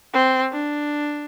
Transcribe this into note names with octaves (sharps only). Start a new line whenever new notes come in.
C4
D4